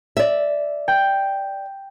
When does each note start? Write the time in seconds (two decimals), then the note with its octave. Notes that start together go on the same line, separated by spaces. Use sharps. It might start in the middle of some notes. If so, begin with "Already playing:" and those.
0.17 D5 E5
0.88 G5